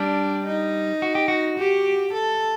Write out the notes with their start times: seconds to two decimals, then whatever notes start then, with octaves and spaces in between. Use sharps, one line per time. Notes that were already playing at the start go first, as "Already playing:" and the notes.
Already playing: G3 D4
0.46 D#4
1.02 F#4
1.15 G4
1.28 F#4
1.58 G4
2.13 A4